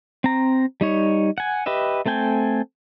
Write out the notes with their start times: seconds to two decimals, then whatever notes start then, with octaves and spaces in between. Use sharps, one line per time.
0.24 C4 A#5
0.81 G3 D#4 C#5
1.38 F#5 G#5
1.66 G4 B4 D#5 E5
2.06 A3 C4 A4 G5 G#5